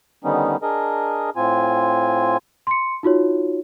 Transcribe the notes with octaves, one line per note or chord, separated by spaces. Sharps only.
D3 D#3 G3 B3 C#4 D#4
D4 G#4 A#4 D#5
A2 C4 F4 G#5
C6 C#7
D#4 F4 F#4 C#5